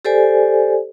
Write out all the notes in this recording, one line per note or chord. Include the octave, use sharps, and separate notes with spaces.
G4 A4 C5 D5 G#5